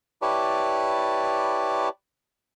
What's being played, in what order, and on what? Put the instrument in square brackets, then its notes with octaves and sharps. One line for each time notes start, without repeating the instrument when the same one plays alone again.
[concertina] E4 G4 B4 C#5 D5 A5